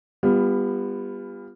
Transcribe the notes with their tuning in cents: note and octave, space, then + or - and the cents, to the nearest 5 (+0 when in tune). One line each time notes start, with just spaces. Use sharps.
G3 +25 B3 +0 F4 +0